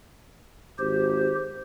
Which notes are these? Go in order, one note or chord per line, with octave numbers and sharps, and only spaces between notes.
G#1 G4 C5